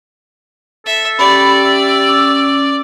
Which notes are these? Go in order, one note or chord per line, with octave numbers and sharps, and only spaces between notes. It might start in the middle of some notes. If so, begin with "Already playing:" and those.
A4 E5
C#4 G4 D5 G5 B5
E5 E6
C#4 D6